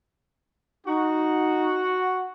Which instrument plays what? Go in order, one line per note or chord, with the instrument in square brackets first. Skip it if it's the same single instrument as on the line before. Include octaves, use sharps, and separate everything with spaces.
[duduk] D#4 [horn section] F#4